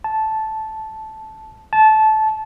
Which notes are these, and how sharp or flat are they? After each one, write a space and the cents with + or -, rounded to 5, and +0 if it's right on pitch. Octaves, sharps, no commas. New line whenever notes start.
A5 -10
A5 -20